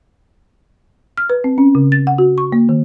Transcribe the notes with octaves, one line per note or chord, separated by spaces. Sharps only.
F6
B4
C4
C#4
C#3
A6
F#5
F#4
C#6
A#3
D#3